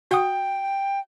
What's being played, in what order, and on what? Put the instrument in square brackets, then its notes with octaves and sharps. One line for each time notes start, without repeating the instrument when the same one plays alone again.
[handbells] F#4 F#5 D#6 [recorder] G5